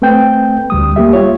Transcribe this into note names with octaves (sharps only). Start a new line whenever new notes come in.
A3 C4 B4 G5 G6
D2 G3 D#6
G3 A#3 G4 E5
F4 C#5